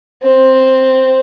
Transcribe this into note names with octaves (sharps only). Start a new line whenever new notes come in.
C4